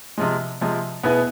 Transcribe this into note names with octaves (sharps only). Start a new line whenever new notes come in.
C3 F3 G#3
C3 F3 G#3
B2 B3 E4 G#4 B4